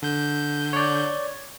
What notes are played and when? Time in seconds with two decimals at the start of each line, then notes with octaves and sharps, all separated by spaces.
0.02 D3 G6
0.73 C#5 D5